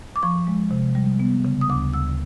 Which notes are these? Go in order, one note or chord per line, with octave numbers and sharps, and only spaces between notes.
D6
F3 C#6
G#3
C3
G3
B3
C#3
D#6
D2 D6
D2 E6